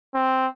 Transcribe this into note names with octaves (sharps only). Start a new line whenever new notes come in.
C4